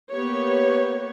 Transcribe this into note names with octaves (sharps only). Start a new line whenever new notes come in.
A#3 B3 G4 C#5